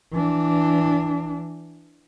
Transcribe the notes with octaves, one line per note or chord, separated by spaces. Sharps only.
E3 D4